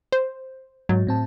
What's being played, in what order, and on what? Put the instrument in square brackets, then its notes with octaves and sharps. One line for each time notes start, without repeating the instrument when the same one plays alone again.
[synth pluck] C5
[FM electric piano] G#2 [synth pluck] F#3
[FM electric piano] A2 C4 A5